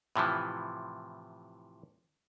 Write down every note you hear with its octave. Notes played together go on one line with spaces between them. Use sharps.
A2 C3 E3 F3